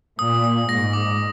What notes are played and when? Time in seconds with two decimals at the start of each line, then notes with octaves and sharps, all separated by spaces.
0.19 A#2 D#6
0.44 D#6
0.69 G#2 A#6
0.93 D6